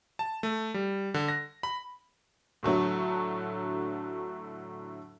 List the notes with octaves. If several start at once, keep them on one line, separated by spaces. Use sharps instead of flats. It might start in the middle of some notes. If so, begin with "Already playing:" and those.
A5
A3
G3
D3
A#6
B5
A2 D3 F#3 A3